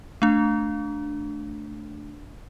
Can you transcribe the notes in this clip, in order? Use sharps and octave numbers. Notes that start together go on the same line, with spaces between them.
A3 D4